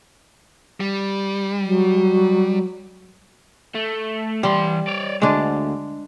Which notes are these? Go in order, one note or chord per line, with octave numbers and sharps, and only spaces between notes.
G3
F#3
A3
E3 G3 C6
C#5 D5
D2 G#3 D4